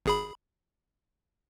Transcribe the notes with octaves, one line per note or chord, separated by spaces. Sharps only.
G#1 G#4 B5